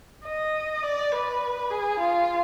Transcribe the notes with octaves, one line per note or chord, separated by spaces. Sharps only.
D#5
D5
B4
G#4
F4